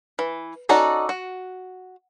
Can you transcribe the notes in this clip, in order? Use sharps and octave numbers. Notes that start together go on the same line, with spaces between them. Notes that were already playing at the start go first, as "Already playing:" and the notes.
E3
C#4 D#4 F#4 A4 D5
F#4